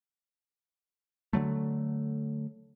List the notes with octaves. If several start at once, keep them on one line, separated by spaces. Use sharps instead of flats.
D3 F#3 A3